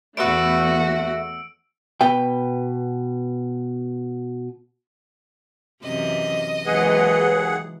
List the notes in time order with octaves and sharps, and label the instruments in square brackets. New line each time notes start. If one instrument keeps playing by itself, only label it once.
[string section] E2 A3 [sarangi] F#4 [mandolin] B4 E5 [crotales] E6 C#7 D7
[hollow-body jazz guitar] B2 B4 G5
[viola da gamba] F#2 C3 E3 [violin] D#5
[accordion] D#2 G#4 F#5 [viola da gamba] E3 F#3 G#3 [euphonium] B4